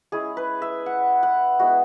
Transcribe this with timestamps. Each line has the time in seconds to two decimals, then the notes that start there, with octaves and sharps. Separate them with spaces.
0.12 G#3 C#4 E4 G#4
0.37 B4
0.62 E5
0.86 F#5
1.23 F#5
1.59 G#3 B3 E4 F#4